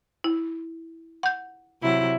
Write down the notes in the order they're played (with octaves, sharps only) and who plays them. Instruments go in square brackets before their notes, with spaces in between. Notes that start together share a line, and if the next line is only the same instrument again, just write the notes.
[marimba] E4
F#5 G6
[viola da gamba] C3 F#3 E4